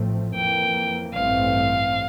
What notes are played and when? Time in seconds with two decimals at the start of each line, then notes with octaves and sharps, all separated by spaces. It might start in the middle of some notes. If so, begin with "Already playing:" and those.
Already playing: A1 A2 F3 A3 C4
0.34 F2 E3 A#3 G5
1.13 A1 G2 E3 A3 C4 F5